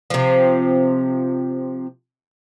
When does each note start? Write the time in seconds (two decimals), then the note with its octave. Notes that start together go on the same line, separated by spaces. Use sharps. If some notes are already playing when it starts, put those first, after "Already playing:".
0.10 C3 F3